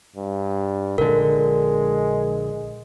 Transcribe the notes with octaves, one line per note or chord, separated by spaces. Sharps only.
G2
A#1 D3 G#3 A#4